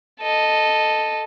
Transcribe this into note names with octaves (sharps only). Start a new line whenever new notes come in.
A4 D#5